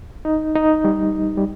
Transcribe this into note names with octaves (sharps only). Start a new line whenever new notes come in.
D#4
D#4
G3
G3